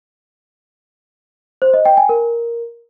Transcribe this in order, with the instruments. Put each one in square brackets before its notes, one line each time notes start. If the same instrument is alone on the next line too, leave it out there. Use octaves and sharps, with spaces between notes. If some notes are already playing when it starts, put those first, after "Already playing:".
[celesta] C5
D#5
G5
G#5
A#4